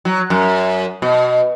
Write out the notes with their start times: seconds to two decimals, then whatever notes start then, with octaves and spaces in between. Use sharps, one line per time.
0.05 F#3
0.30 F#2
1.02 B2